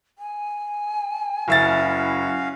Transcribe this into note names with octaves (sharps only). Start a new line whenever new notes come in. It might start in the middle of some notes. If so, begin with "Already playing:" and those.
G#5
F#1 C#4 E4 F#4 E5 F5 A6